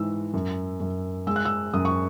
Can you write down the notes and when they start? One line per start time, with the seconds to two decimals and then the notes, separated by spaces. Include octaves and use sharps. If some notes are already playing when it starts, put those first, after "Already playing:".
Already playing: G#2 E3 E6
0.34 F#2
0.80 F#2
1.27 G#3 E6
1.36 F#6
1.45 E6
1.73 F#2 D#6
1.85 C#6